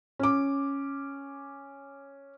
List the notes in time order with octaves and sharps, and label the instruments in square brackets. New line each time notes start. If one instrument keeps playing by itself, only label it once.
[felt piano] C#4 D6